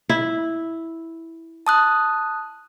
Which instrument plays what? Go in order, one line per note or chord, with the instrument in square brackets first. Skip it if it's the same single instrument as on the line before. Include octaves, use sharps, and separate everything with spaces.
[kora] E4
[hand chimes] A5 D#6 F#6